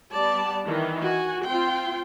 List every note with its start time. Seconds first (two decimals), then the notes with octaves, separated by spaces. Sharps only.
0.15 G3 B3 D5 A5
0.66 D#3 E3
1.04 F#4 G#5
1.47 C4 F4 G5 C6